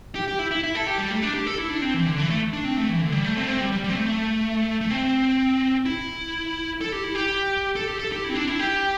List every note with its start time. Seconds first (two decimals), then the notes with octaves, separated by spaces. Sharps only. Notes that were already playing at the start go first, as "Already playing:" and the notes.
0.15 G4
0.28 G4
0.39 E4
0.51 E4
0.64 E4
0.75 A4
0.87 G4
0.98 G3
1.10 A3
1.22 D4
1.34 G4
1.46 A4
1.58 E4
1.70 D4
1.82 C4
1.94 E3
2.06 D3
2.18 E3
2.30 A3
2.53 D4
2.64 C4
2.77 A3
2.89 E3
3.01 D3
3.12 G3
3.24 A3
3.37 C4
3.43 A3
3.48 C4
3.61 G3
3.72 G3
3.84 G3
3.90 C4
3.95 A3
4.81 A3
4.91 C4
5.85 E4
6.81 A4
6.92 G4
7.04 E4
7.15 G4
7.76 A4
7.88 G4
8.00 A4
8.12 G4
8.24 E4
8.30 C4
8.35 D4
8.48 E4
8.59 G4